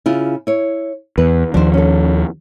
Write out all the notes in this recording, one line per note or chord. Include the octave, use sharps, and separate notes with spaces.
C#3 E4 F4
E4 C#5
E2 B4
D#2 F3 D4 C5
C#4 A4